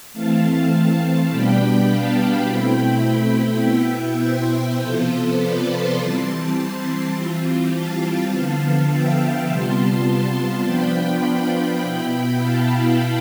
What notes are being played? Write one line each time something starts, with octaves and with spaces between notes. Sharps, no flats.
E3 A3 C4 F5 A5
B2 G3 B3 D4 G5 B5
F5 A5
B2 A3 C4 E4 G5 B5
B2 B3 E4 E5 G5
C5 E5
C3 F3 B3 F4 A4 C5
B4 D5
A5 C6
E3 G3 C4 A5 C6
E3 G3 C4 F4
F5 A5
D3 F3 B3
E5 G5
F5 A5
C3 G3 B3 F4 A5 C6
F3 B3 D4 F4 G5 B5
B2 B3 E4
F5 A5